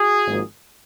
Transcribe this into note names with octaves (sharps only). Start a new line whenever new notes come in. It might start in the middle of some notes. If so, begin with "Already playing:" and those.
Already playing: F#4 G#4
G#1 G#2 F3 A#3